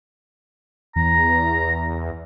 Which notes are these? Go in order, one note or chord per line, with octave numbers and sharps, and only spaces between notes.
E2 A#5